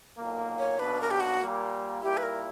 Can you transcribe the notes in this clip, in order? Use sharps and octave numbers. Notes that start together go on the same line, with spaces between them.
B1 A#2 A#3
C#5
B1 B2 A#3 D4 B4
A#4
G4
F#4
A#2 G3 A#3
A#2 G3 A#3 E4 G4
B4
A#4